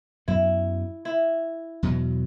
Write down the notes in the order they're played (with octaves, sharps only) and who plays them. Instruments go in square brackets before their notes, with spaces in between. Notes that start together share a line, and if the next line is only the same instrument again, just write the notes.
[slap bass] F#2 F#3 B3 [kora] E4
[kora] E4
[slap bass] E2 B2 F#3